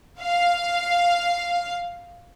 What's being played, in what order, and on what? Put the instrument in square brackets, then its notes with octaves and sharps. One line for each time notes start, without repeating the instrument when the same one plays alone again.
[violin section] F5